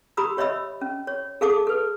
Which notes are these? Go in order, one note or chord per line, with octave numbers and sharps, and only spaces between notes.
G4 A#5 B5 D#6 E6
G4 C#5 D#5 E5 B5 E6
C#4
C#5
G#4 A4 F5 A5 D6 D#6
A4 B4